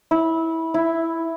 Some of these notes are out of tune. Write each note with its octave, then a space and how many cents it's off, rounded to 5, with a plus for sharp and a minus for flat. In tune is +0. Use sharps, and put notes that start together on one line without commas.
E4 -20
E4 +0